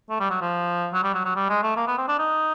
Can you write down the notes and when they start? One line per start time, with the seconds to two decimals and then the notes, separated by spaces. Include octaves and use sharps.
0.10 A3
0.20 G3
0.30 F#3
0.41 F3
0.94 F#3
1.04 G3
1.14 F#3
1.25 F#3
1.36 G3
1.49 G#3
1.63 A3
1.77 A#3
1.87 B3
1.98 C4
2.08 D4
2.19 D#4